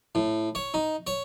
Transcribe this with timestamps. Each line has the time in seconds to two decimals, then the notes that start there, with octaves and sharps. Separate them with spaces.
0.15 A2
0.55 C#5
0.74 D#4
1.07 C#5